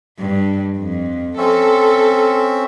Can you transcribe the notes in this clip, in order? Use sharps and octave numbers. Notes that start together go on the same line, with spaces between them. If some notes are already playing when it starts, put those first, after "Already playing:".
G2
F2
C4 C#4 A4 E5